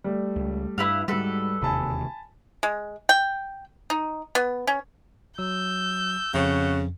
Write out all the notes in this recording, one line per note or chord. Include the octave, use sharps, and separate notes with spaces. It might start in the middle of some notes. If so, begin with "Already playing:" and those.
G3 A3
C#2
G2 E4 B4 F5
G#2 G3 F#4 A4 B4
E1 D#2 C3 G#5 A5 B5
G#3
G5
D#4
B3
C#4
F#3 E6 G6
F2 C#3 F#4